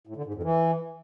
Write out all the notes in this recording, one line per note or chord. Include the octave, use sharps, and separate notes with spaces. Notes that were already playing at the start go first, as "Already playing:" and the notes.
A2
D3
G#2
F2
E3